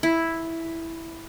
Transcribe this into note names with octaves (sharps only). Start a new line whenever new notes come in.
E4